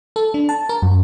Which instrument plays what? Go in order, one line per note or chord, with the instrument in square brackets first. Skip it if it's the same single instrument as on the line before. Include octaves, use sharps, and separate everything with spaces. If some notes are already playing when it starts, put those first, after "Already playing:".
[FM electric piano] A4
D4
A5
A#4
F#2